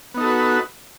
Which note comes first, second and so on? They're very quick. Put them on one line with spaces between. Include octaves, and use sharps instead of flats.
B3 D#4 A4 F#4 B4